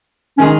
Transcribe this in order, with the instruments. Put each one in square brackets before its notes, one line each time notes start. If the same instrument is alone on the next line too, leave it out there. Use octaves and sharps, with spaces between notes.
[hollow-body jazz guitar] D#3 G#3 D#4 [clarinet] C#4